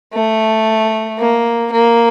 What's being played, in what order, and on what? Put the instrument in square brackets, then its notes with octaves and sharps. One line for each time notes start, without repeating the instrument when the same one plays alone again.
[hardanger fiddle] A3
A#3
A#3